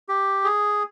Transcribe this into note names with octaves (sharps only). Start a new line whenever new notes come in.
G4
G#4